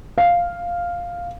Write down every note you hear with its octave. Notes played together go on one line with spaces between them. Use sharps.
F5